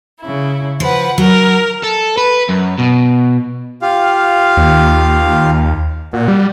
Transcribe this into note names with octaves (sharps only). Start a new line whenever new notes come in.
C#3 E4
F3 B4 F#5
F#3 A#4
A4
B4
F#2
B2
F4 G4 F5
D#2
A#2 F#4
G3